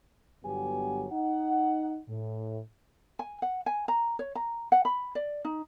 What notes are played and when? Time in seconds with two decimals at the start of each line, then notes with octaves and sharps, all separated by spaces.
0.45 G1 G2 F#3 B3 G4 G#5
1.12 D#4 F#5
2.09 A2
3.19 G#5
3.42 F#5
3.66 G#5
3.88 A#5
4.19 C#5
4.35 A#5
4.72 F#5
4.85 B5
5.15 D5
5.45 D#4